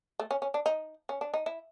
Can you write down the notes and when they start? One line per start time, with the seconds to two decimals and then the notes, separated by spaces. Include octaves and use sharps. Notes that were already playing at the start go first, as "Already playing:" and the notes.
0.19 A3
0.31 C#4
0.42 C#4
0.54 D4
0.66 D#4
1.09 C#4
1.21 D4
1.34 D#4
1.46 E4